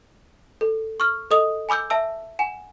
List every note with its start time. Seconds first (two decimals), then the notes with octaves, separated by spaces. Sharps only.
0.61 A4
1.00 C#6 E6 F6
1.31 A4 D#5 D#6 F7
1.69 G#5 B5 D6 E6 G6
1.90 E5 A5 E6
2.39 F#5 G#5 E7